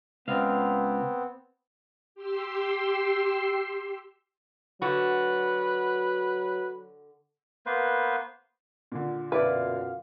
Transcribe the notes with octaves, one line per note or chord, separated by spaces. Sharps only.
C#2 B3 C4 F5
G4 C6 E6 C7
D3 F#3 F#4 B4
A#3 B3 B4 C5
A#2 D3
F#2 B2 E4 B4 D5 F5